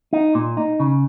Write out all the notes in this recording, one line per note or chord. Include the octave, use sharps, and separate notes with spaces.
D#4
A#2
D#4
C#3